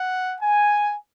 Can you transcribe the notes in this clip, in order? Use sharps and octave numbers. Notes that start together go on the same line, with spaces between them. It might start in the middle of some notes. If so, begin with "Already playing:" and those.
Already playing: F#5
G#5